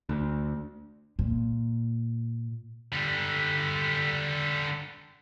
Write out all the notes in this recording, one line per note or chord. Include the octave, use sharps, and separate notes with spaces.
D2
A#2
D3 G3